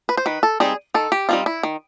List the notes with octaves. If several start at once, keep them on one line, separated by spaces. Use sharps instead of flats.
B4
C5
D#3 B4
A4
G3 C4 D#4 G#4
D#3 A4
G4
G3 C4 D#4 F4
E4
D#3